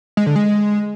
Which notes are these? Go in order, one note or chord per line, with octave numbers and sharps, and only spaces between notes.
G#3
D3
G#3